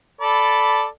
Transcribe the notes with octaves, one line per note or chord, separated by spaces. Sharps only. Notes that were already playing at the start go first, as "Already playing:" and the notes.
A4 D5 B5